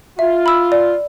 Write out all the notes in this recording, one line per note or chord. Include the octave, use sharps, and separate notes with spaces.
F4 E5
B5 E6
D5